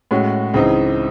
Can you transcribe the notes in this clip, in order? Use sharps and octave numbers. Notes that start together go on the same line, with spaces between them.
A2 G#3 C#4 F#4
C#2 C#3 E3 C4 D#4